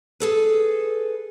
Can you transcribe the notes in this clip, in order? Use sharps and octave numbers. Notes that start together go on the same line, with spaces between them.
G#4 A4 B4